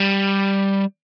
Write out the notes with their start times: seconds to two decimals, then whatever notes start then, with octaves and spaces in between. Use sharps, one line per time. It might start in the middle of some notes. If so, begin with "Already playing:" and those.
Already playing: G3